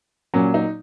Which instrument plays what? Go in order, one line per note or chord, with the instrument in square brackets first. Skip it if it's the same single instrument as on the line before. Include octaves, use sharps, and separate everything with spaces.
[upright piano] A#2 F#3 C#4
D#4